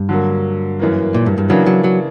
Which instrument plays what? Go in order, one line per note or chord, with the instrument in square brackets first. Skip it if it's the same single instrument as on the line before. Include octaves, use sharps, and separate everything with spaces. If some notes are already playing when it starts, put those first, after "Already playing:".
Already playing: [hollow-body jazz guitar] G2
[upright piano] D3 F#3 A#3
F#2 E3 A#3
[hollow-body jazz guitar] A#2
G2
G2
[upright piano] C#3 E3 A#3 D4 [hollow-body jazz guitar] F#3
[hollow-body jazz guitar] F#3
F#3